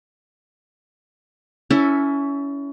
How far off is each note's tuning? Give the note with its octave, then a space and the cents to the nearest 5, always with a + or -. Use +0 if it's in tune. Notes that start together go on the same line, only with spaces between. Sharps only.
C#4 +25 E4 +0 A4 +15